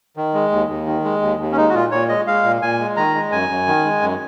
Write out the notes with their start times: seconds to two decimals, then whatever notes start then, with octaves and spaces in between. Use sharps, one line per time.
0.17 D#3
0.34 G#3
0.52 D#2
0.69 D#2
0.86 D#3
1.04 G#3
1.22 D#2
1.39 D#2
1.52 C#4
1.56 G#3 D#4
1.69 F#4
1.74 A#2 F4
1.91 A#2 C#5
2.09 G#3 D#5
2.27 G#3 F5
2.44 A#2
2.62 A#2 G#5
2.80 G#3
2.97 D#3 A#5
3.15 G#3
3.32 F#2 G#5
3.49 F#2
3.67 D#3
3.85 G#3
4.02 F#2